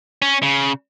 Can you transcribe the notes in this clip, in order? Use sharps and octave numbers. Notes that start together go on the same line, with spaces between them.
C#4
C#3